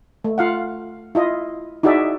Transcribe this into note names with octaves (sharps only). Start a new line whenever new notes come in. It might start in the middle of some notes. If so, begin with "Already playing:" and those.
A3
F4 F5 F#5
E4 F4 D#5
D#4 E4 F#4 G#4 D5 E5